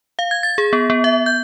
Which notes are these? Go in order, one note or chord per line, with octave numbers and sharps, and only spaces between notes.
F5
G#6
A6
G#4
B3
B3
E5
G6